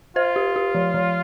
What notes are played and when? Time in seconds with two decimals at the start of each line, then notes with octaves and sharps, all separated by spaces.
0.16 F4 C5
0.36 G4
0.56 G4
0.75 F3
0.94 F3